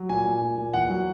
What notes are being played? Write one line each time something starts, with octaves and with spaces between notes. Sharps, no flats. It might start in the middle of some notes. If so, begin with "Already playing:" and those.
Already playing: F#3
A#2 G#5
A#2
A#2
A#2
E2 F#5
F#3